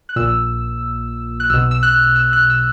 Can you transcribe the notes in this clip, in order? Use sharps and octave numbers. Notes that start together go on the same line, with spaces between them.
F#6
A#1 A#2 E6
F#6
B1 B2 E6
E6
F#6
E6
F#6
E6